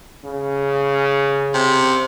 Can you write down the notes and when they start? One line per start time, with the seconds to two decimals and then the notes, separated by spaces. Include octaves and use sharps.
0.24 C#3
1.54 C3